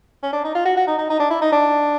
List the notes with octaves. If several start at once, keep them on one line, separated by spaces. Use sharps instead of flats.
C#4
D4
D#4
F4
F#4
F#4
D#4
D#4
D#4
D4
E4
D#4
D4